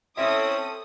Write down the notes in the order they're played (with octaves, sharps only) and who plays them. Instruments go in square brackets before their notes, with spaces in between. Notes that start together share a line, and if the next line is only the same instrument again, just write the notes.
[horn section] C4 C#4 E4 [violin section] A4 D#6 [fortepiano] E5